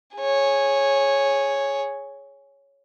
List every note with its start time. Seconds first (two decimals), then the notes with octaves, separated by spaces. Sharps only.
0.17 G#4 C#5